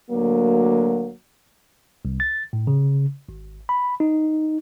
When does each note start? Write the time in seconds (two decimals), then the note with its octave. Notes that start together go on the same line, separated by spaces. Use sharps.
0.10 D2 F#3 A#3
2.05 C2
2.20 A6
2.53 A2
2.67 C#3
3.29 G#1
3.69 B5
4.00 D#4